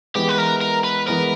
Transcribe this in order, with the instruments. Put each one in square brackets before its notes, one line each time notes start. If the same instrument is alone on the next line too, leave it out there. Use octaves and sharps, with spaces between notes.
[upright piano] E3 G#3 B3 [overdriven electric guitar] G4
[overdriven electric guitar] B4
A#4
A#4
B4
[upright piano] E3 G#3 B3 [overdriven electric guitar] A#4